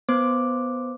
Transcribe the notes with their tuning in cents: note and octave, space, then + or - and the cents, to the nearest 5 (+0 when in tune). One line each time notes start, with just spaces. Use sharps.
B3 +0 C5 +0 D6 +0